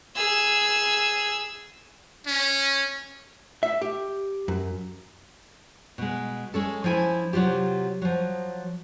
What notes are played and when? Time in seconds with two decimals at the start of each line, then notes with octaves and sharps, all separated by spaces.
0.16 G#4 E6
2.27 C#4
3.63 E5
3.82 G4
4.48 F#2
5.98 B2 G#3
6.54 G#3 C#4 A4
6.84 F3 C#4 E4 G#5
7.33 C3 F#3 A3 F4 G4
8.02 F3 F#3